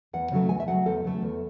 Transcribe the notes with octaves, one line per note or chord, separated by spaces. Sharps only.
E2 F#5
C#3 F#3 A3
E2 G#5
E5
C#3 F#3 A3 F#5
E2 A4
C#3 F#3 A3
E2